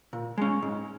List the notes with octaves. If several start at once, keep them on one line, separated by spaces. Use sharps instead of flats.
A#2
G#3 C#4
G#2